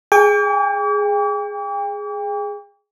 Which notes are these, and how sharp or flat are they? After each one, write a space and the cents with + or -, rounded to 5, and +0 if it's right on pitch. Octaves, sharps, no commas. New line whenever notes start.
G#4 +0 G5 +35 D6 -45